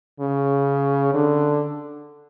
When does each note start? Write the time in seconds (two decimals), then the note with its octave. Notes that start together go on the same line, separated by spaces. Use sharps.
0.20 C#3
1.15 D3